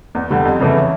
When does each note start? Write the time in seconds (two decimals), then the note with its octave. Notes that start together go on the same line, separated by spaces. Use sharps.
0.15 E2
0.31 D3 G3
0.45 F2
0.61 C#3 E3 A3